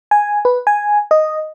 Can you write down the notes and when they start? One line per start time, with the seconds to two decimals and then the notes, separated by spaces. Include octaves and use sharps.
0.11 G#5
0.45 B4
0.67 G#5
1.11 D#5